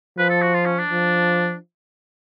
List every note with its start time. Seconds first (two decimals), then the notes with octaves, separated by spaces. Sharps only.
0.18 F3 B4
0.29 A4
0.42 F#4
0.54 F4
0.66 C#4
0.78 D4
0.90 F3